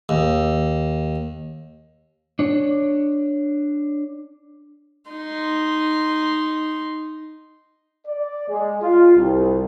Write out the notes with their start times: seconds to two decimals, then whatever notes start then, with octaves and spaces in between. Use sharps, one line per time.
0.09 D#2
2.39 D4 C#5
5.10 D#4 C6
8.07 D5
8.48 G#3
8.82 F4
9.16 C2